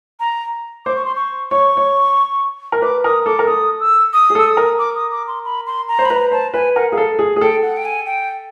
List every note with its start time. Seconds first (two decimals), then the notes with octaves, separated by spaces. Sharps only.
0.20 A#5
0.86 C5 D6
0.96 C#6
1.05 C6
1.16 C#6
1.51 C#5 C#6
1.77 C#5
2.72 A#4
2.82 B4 D6
3.04 A#4 D#6
3.26 A4 D6
3.39 A#4
3.47 A4 D#6
3.80 E6
4.13 D#6
4.30 G#4
4.35 A4 E6
4.47 D#6
4.57 A#4
4.79 D6
4.95 D#6
5.12 D6
5.27 C6
5.45 B5
5.66 C6
5.88 A#5
5.99 C5
6.05 B5
6.10 B4 A#5
6.31 C5 A5
6.54 B4 G#5
6.75 A#4 F#5
6.92 G#4 F5
6.97 A4
7.19 G#4
7.36 G#4
7.41 A4 G5
7.62 F#5
7.77 G5
7.85 G#5
8.06 G5